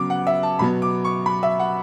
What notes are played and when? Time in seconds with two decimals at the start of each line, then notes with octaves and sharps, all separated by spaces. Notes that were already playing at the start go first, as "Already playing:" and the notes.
Already playing: C#3 F#3 B3 D6
0.10 F#5
0.27 E5
0.43 A5
0.59 B2 F#3 B3 B5
0.82 D6
1.05 C#6
1.26 B5
1.43 E5
1.59 F#5